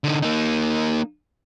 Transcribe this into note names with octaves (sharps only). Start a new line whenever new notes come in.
D3 D#4
A#3 D#4